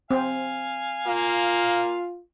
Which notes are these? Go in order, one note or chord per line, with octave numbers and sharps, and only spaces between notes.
C4 F5 G#5
A#3 F4